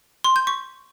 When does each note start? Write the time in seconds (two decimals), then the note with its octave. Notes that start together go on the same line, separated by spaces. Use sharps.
0.24 C6
0.36 G6
0.47 C#6